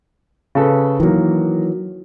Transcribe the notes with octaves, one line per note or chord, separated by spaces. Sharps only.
C#3 A4 B4
D#3 E3 F#3 A#3